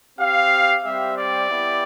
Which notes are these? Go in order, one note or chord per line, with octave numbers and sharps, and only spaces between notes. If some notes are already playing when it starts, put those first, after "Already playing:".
C4 G4 F5
G3 C4 G4 E5
D5
B3 E4 G4